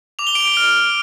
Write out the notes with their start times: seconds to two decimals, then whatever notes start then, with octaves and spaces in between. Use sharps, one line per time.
0.19 D6 F7
0.27 G7
0.35 D7 F7
0.57 F6